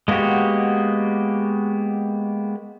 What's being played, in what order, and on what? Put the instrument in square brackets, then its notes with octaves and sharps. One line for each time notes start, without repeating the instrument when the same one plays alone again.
[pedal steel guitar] G#3 A#3 B3 F#4 G4